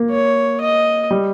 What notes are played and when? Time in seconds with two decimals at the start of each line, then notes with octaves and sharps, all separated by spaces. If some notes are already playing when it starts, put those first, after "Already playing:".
Already playing: A#3
0.10 C#5
0.61 D#5
1.11 G3